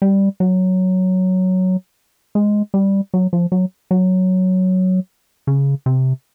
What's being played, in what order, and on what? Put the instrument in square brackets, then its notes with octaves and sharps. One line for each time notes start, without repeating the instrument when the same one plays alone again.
[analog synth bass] G3
F#3
G#3
G3
F#3
F3
F#3
F#3
C#3
C3